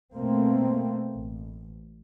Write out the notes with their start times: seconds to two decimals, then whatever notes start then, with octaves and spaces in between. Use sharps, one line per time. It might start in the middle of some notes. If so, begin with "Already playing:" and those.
0.14 B2 A3 A#3 C4
1.14 A1